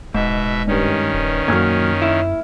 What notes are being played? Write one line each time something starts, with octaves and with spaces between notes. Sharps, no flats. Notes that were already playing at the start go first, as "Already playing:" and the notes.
D1 G#2 B2 E5
G2 D#3 C#4 G4
D#1
F#2 A#2 F#3 A#3 F6 G#6
E4